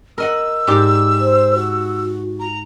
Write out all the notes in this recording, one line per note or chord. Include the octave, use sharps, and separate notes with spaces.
A#4 D#5 F#5 E6
G#2 G4 D5
C5
F#4
A#5